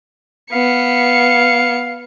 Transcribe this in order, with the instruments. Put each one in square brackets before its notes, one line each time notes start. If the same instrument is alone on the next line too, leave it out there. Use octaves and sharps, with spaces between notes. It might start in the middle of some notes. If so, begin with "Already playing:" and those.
[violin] B3 C#7 [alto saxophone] F5